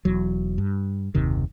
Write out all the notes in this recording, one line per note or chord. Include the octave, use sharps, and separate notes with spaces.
E1 E2 F#3
G2
F#1 D#2 C3 D#3